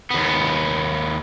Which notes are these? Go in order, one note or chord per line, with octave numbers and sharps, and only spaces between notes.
D#2 B3